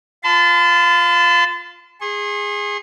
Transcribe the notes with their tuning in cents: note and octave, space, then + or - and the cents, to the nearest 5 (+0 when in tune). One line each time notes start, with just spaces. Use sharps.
F4 +0 A5 -10 C6 -45
G#4 -15 C6 +40